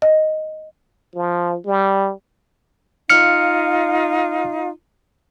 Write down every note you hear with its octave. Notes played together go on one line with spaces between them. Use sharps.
D#5
F3
G3
D#4 F4 F5 F6 C#7